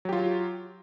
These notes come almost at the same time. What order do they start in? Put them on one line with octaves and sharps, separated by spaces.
F#3 G4 F4